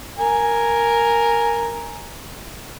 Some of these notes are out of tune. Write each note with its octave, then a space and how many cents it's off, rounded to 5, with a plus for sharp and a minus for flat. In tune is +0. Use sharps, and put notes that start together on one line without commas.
A#4 +0 G#5 +0